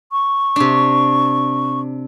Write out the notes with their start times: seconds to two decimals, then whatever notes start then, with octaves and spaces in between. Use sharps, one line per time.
0.12 C#6
0.56 C3 D4